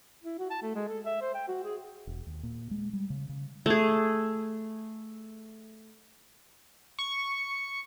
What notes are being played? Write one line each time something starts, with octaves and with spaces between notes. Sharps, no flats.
E4
F#4
A5
A3
G#3
A4
E5
C5
G5
F#4
G#4
E1
D#2
A#2
G#3
G3
C#3
C#3
A3 G#4
C#6